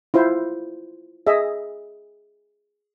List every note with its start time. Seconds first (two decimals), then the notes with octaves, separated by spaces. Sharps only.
0.14 E4 F4 C5
1.27 G#4 D#5 E5